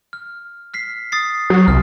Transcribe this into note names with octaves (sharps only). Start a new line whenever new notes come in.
F6
F6 B6 C7
D#6 A6 C7
F#3
C2 F6